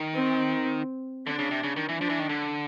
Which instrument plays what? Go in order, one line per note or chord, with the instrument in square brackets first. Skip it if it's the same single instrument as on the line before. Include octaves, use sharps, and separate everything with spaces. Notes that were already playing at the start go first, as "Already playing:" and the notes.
Already playing: [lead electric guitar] D#3
[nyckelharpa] C4
[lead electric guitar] D3 [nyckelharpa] D4
[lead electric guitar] C#3
C3
C#3
D#3
E3
[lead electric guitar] F3 [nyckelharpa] D4
[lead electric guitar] E3
D#3
D3